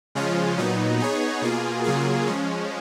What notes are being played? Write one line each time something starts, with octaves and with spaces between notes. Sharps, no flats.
C#3 F3 G#3 C#4 F4
A#2 F#3 B3 D#4
B3 D#4 G#4 C#5
B2 A#3 F4 G#4
C#3 F#3 A#3 F4 G#4
F3 G#3 C#4